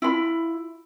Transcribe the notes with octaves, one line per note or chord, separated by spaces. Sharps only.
E4 F4 B5